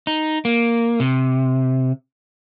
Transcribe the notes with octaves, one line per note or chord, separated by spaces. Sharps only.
D#4
A#3
C3